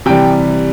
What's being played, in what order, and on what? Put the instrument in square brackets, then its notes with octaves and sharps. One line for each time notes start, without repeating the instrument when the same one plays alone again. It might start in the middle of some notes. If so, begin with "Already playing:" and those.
[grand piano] C3 E3 G3 G5